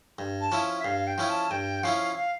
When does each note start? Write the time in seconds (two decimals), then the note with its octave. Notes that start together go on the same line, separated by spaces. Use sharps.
0.19 G2
0.41 A5
0.52 F3 C#4 E4
0.78 E5
0.85 G2 F5
1.07 G5
1.18 F3 C#4 E4
1.29 A5
1.51 G2 G5
1.83 F3 C#4 E4 F5
2.16 F5